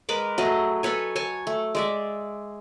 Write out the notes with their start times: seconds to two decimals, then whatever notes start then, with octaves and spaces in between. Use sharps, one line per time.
0.09 G#3 A#4 B4 D6
0.38 F#3 A3 G#4 D#5
0.83 A4 B4 C#5 G#5
1.16 C#5 G#5 A5 C#6
1.47 A3
1.75 G#3 D5 E5